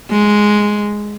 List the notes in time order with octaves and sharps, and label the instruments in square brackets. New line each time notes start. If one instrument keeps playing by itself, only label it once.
[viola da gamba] G#3